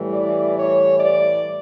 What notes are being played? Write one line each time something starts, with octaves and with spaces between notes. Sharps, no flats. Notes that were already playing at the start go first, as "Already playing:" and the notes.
Already playing: A2 E3 G3
D5
C#5
D5